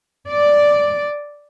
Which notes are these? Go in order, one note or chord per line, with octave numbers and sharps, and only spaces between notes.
D5